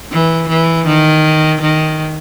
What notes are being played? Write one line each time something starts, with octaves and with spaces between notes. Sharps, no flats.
E3
E3
D#3
D#3